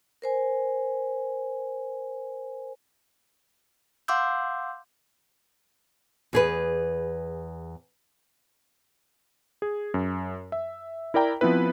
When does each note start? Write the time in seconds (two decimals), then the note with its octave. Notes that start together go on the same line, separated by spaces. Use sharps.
0.22 A#4 C5 G#5
4.08 F5 F#5 C6 D6 E6 G6
6.33 E2 G#4 B4
9.62 G#4
9.94 F#2
10.52 E5
11.14 E4 A#4 D5 G5 A#5
11.41 F3 B3 C4 E4 B4